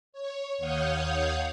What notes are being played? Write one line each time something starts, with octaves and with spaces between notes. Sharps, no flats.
C#5
D#2 C#5 F5 F#5 D#6 G6